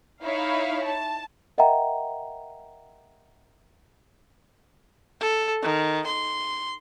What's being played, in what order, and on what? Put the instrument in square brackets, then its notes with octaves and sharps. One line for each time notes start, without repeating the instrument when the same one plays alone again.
[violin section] D#4 E4 C#5 F5
A5
[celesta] A#4 D#5 E5 F#5 G5 A#5
[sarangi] A4
D#3
C6